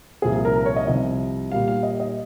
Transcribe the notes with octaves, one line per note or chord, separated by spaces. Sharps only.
C2 A#2 F3 A#3 G#4
A#4
A#4
C#5
D#5
C2 C3 F3 D#5
A#2 G3 A#3 F5
F5
D#5
D#5